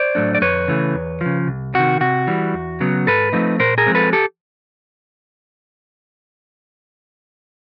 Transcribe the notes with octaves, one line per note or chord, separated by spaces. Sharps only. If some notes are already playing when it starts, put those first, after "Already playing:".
Already playing: C5 D5
A2 F#3 A3 D4
D5
F2 B4 C#5
C#3 E3 A3
E2
F3
C#3
C2
C3 D#3 F#4
C3 F#4
E3 G3
E2
C#3 F#3 B3
G#2 A4 B4
F3 A3 C4 D#4
A#2 A#4 C5
G#4 A#4
F3 G#3 C4
A4 B4
G4 A4